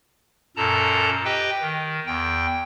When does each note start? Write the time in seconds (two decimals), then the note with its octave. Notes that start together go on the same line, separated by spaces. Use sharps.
0.56 F#2 A#2 A4 A5 A#5
1.25 G4 B4 D#5 G5
1.61 D#3
2.06 E2 G5